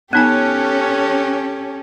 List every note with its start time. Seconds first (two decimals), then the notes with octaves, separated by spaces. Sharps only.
0.13 B3 C#4 D#4 G4 A4 G#5 A5 F#6